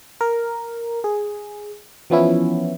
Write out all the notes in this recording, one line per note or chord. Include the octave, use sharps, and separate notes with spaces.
A#4
G#4
E3 F3 B3 C#4 E4